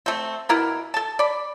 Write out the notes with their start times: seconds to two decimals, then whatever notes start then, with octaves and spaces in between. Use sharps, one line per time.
0.06 A3 C4
0.49 B2 E4 A#4 B4
0.94 A4 A5
1.19 D5 B5